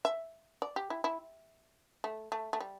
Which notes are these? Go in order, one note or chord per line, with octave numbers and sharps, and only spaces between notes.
E5
D5
G4
E4
E4
A3
A3
A3
G3